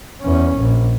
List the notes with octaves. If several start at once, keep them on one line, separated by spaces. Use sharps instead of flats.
E2 C#4
A#1